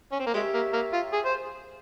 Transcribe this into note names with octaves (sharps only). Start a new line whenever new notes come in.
C#4
C4
A#3
G#3 G4 C#5 E5
A#3
A#3
F4
G#4
C5